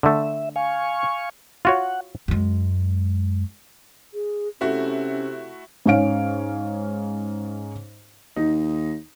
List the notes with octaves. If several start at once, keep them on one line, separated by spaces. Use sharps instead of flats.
D3 A3 E5
F5 G#5 C#6
F4 F#4 C#5 F#5
F#2 G#3
G#4
C3 A3 C#4 E4 F#4
G#2 C#4 C#5 F5 D7
D#2 D#4